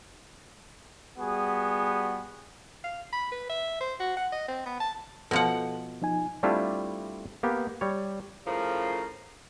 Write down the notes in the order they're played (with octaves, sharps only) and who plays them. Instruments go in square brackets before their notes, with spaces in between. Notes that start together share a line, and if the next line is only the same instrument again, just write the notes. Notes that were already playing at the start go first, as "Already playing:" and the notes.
[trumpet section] G3 B3 F#4 G#4
[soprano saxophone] F5
B5
B4
E5
C5
F#4
F#5
D#5
C4
B3
A5
[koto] B2 F3 F#5 [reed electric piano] A4
[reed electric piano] F3 D#4 G#5
[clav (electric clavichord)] G3 A3 C4 D4 E4 F4
A#3 B3 G4
G3 C#5
[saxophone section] A2 C#3 F3 A#4